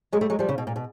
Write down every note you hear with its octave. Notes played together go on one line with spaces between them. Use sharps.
F#3 G#3
G3 A3
F#3 G#3
F3 G3
C#3
B2
A#2
B2